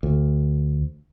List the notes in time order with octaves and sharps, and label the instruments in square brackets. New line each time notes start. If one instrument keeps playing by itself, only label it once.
[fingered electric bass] D2